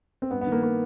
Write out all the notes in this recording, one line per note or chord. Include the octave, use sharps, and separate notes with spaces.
C4
G2 B3
B3
D#3
A#3
A#3